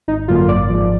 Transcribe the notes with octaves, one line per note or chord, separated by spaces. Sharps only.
G#1 D#4
F#2 D3 F#3 A#3 F4
G#1 D5
G#2 F3